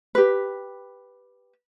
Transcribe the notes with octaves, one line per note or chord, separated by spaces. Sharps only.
G4 B4